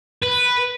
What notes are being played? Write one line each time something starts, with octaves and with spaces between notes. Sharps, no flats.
B4